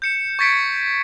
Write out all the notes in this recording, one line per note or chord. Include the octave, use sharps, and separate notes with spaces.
G6 C#7 E7
C#6 G#6 A6 B6 C#7 D7